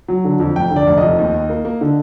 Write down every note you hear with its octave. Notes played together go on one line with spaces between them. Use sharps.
F#3
D3
F2
F1 G5
D3
D5
F1
F2 D#5
D#2
D#2
A#3
A#3
D3